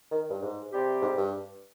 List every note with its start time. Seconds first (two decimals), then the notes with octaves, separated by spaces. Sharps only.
0.11 D#3
0.30 G2
0.42 G#2
0.71 C3 G3 C4 G4
1.02 G#2
1.17 G2